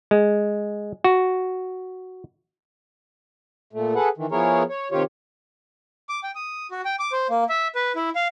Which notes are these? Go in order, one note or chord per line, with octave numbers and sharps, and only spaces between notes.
G#3
F#4
A#2 A3
G#4 A4 B4 F#5
D#3 E3
F3 B3 E4 G#4 A#4 C#5
C#5
C3 D#3 F4 G4 C#5
D6
G5
D#6
F#4
G5
D6
C5
A#3
E5
B4
E4
F5